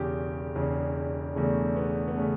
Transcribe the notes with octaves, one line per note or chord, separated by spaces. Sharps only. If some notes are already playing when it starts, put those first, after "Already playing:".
Already playing: E1 E2 C#3 G4
E1 E2 C#3
E1 E2 C#3 A3
B3
B3
C#3 A3